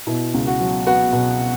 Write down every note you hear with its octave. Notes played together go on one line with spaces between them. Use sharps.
B2 E4
C#2
F#4
F#3
B3 F#4
B2